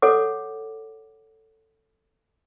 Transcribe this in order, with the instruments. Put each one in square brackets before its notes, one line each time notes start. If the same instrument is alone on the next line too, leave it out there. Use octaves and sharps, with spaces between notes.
[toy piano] A4 C#5 F#5 D6